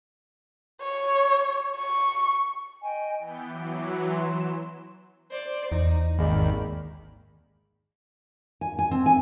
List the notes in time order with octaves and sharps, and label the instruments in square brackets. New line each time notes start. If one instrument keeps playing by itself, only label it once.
[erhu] C#5
C#6
[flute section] D#5 G5 G#5
[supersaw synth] E3 B3 G6 [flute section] G5
[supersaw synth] E3 F#3 [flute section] G5 D6 F#6
[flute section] C6 [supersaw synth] E7
[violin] C5 D5
[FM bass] E2 [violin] D#4
[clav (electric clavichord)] G#1 G#3 D5 [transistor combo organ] D#2 [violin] B5
[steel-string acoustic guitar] G#5
G#5
C4
G#5